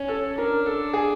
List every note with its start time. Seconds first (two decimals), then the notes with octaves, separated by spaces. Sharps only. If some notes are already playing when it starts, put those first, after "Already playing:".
Already playing: C#4
0.08 A4
0.37 D4 A#4
0.66 A4
0.93 G#4